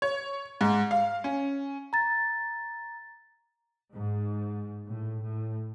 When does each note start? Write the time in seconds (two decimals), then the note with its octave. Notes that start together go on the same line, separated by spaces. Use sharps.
0.02 C#5
0.61 G#2
0.91 F5
1.24 C#4
1.93 A#5 A6
3.94 G#2
4.87 A2
5.23 A2